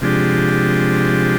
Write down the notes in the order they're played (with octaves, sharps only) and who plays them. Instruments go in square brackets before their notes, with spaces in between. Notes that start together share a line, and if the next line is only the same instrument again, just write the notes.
[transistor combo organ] C3 F3 G#3 D4 G4